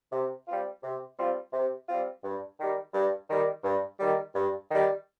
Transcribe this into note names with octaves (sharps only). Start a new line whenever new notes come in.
C3
G3 C4 F4
C3
G3 C4 F4
C3
G3 C4 F4
G2
D#3 G3
G2
D#3 G3
G2
D#3 G3
G2
D#3 G3